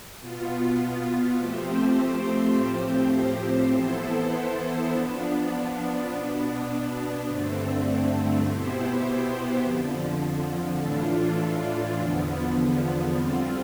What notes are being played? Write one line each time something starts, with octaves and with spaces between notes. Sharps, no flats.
B2 B3 F4
F3 A3 C4 G4 C5
A2 F3 C4 G4 C5
E3 B3 E4 A4 C5
F3 B3 D4
B2 B3 D4
G2 D3 A3 C4
B2 B3 E4 G4 C5
F2 D3 F3
A2 E3 A3 D4 F4
E2 D3 F3 B3
D3 G3 C4 F4